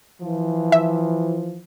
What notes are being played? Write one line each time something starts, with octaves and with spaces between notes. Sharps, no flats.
E3 F3
E5